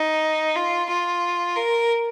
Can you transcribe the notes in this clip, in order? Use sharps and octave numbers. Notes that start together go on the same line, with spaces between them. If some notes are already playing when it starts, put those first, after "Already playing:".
Already playing: D#4
F4
F4
A#4